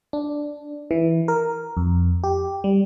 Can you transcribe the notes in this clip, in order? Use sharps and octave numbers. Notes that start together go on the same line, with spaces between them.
D4
E3
A#4
F2
G4
G3